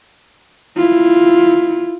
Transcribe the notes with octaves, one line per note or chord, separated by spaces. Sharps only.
E4 F4